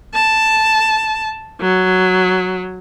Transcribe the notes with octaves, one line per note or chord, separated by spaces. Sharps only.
A5
F#3